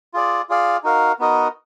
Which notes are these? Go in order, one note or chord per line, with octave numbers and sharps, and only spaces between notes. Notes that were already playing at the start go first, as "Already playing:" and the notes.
F4 G#4 D5
F4 G#4 D5 F5
D#4 F#4 A#4 F5
B3 D#4 F#4 A#4 D#5